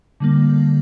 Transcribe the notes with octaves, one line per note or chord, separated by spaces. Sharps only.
D3 G3 A#3